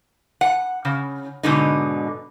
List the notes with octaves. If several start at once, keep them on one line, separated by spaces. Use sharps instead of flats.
F#5
C#3
G#2 B2 D3 D#4